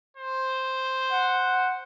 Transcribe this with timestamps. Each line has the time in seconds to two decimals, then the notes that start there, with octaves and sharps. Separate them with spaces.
0.17 C5
1.11 F#5